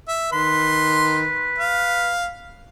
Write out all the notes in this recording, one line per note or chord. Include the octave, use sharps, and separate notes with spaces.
E5
D#3 B4 C6
F5